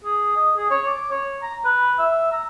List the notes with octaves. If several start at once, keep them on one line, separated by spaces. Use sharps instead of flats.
G#4
D#5
G#4
C#5
D6
C#5
A#5
B4
E5
A#5